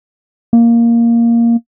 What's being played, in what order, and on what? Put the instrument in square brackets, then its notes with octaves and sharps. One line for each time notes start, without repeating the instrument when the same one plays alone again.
[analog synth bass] A#3